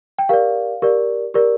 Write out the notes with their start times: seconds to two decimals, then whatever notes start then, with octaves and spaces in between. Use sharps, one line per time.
0.19 G5
0.29 G4 A#4 D5 F5
0.82 G4 A#4 D5
1.34 G4 A#4 D5